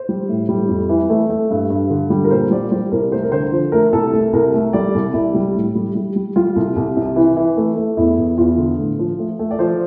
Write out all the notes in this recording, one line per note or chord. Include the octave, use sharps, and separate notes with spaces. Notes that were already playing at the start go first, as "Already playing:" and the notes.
Already playing: C5
G3
A2
G3
F2
E3
A3
A3
G2
G2
D3
G3
A#4
A#2 C5
G3 D5
G3 C5
C2 A#4
A3 C5
A#4
D3 C5
F3
A3 A#4
C2 A4
A3
C2 A#4
A3
G3 D5
C2
C2 E4
G3
A2
G3
G3
G3
G3 F4
C2
C2
C3
E3
E3
A3
A3
E2 E4
E2
E2 F4
D3
A2
F3
A3
A3
D5
F3 C5